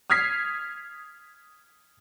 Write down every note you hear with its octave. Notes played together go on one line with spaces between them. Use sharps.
D#6 F6 G#6 B6 C7